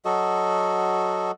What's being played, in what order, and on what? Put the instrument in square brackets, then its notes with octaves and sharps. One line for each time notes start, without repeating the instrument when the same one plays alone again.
[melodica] F#3 F#4 A4 D#5